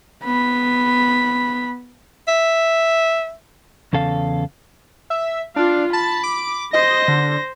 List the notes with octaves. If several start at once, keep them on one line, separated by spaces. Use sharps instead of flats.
B3 B5
E5
E2 C#3 A4 F5
E5
D4 F4 F5
A5 B5
D6
C5 D#5 A#6
D3